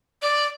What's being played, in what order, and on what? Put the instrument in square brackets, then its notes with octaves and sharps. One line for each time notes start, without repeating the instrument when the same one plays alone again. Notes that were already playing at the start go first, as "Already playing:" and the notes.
[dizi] D5